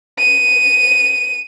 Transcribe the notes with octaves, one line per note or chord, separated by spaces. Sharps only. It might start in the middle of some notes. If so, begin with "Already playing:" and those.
D#7